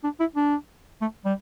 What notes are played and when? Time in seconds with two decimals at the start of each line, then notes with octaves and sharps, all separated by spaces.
0.04 D4
0.20 E4
0.36 D4
1.01 A3
1.25 G3